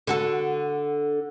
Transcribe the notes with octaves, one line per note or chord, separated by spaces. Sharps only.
D3 F#4 A4